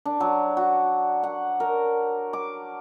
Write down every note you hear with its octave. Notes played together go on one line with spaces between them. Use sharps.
D4
F#3
F#4
F#5
A#4
D6